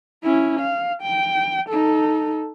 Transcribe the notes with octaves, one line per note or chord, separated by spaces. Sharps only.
C#4 E4
F5
G5
D#4 A4